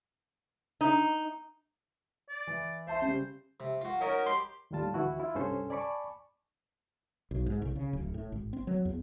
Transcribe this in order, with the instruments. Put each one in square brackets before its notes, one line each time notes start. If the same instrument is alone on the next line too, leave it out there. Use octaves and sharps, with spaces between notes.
[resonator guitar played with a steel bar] D#4
[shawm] D5
[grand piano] E3
[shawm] C5 [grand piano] E5 A5 C6
[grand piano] C#3 G3 [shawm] C5
[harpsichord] C3
F4 F#4
[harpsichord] C#4 D#4 F#4 [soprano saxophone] A#4
[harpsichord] G4 [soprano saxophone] C6
[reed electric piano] D#2 A2 D#3 G3 F4 A5
D2 E3 E4 F#4
E4 F4
C2 G2 C#4 A4 C5 G#5
D5 G#5 A5 B5 C#6 D6
[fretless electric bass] B1
G#2
C2
C#3
D1
A2
G#1
C4
F#3
E2